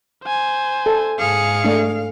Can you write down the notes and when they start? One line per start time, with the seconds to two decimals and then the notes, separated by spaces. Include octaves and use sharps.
0.24 C5 G#5
0.86 A4
1.19 G#2 G#4 F5 C#7
1.64 A3 D4